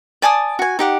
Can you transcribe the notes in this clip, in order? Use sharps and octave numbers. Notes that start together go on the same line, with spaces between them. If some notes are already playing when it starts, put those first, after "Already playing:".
D5 G#5 A5 D#6
F#4 G#5
D#4 G4 F#5